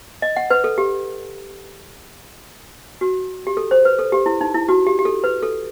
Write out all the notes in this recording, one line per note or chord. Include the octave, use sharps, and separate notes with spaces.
D#5
F#5
B4
A4
G4
F#4
G4
A4
C5
B4
A4
G4
E4
D#4
E4
F#4
G4
G4
A4
B4
A4